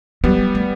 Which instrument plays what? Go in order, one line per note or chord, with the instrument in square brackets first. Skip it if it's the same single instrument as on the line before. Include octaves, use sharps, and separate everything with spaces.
[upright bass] F#3 [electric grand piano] G3 B3
[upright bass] A3